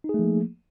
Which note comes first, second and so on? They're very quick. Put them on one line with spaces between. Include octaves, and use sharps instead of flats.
D#4 G#4 A3 F3 A#3